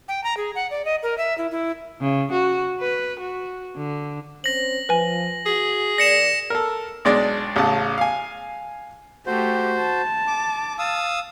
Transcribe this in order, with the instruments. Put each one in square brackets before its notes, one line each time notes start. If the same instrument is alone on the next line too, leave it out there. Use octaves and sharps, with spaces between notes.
[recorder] G5
A#5
G#4
F#5
D5
D#5
A#4
E5
E4
E4
[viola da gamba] C#3
F#4
B4
F#4
D3
[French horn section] C4 C#4 C5 [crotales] A#6 F#7
[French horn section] F3 [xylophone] B4 G#5
[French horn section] F#4 [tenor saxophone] G#4
[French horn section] D#2 A#3 D5 [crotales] A#6 C#7 E7
[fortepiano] A4 A#4
B1 G#3 D4 D5
A1 C#3 A5
F5 G#5
[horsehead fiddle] A3 G4 [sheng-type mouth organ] F#4 C5
[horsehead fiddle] A5
[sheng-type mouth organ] D6
F5 D#6 E6